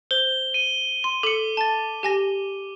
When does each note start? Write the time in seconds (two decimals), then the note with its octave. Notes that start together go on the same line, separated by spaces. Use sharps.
0.11 C5 G7
0.54 D#7
1.04 C6
1.23 A4 D6 C#7
1.57 A5 A6
2.03 G4 G#5 A#6